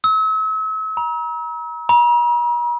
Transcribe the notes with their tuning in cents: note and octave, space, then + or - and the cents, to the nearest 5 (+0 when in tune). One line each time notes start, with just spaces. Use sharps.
E6 -40
A#5 +35
A#5 +45